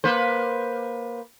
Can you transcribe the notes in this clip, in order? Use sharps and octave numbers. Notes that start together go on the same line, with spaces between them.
A#3 B4 C5